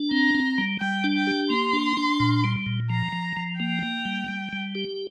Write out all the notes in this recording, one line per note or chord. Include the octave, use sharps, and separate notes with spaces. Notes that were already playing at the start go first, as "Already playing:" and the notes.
Already playing: D4
C4 A#5
C4
G3
G3 G5
D4
G5
G4
A#3 C6
D4
D4
A#2
G3
A#2
F3 A#5
F3
F3
A#3 G5
A#3
G3
G3
G3
G4